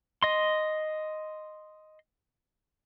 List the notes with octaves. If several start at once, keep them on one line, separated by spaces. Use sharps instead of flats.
D#5 C6